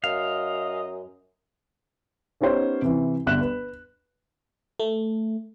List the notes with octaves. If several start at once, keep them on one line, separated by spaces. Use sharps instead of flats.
F#2 D#5 F5
B3 C#4 D#4 G4 C5 C#5
C3 E3
G1 E5 F#6 E7
B4
A3